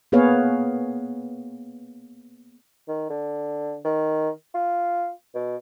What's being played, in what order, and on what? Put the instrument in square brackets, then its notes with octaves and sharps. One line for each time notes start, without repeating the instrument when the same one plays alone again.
[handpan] A#3 B3 G#4 B4 C#5 F5
[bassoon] D#3
D3
D#3
F4
B2